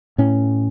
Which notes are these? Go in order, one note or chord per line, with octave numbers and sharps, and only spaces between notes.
A2 C#4